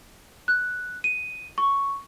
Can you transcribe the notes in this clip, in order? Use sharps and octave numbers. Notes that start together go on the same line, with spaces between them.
F#6
D#7
C#6